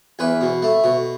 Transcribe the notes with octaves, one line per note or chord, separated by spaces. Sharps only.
E2 B4
B2
A3
B2